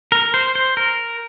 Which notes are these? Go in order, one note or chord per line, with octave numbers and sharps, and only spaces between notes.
A#4
C5
C5
A#4